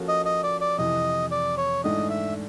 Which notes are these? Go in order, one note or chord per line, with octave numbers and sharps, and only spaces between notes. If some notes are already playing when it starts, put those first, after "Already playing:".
Already playing: F3 A#3 C#4 F#4 A4
D#5
D#5
D5
D5
F2 C3 E3 D#5
D5
C#5
G#2 E3 A3 D4 D#5
E5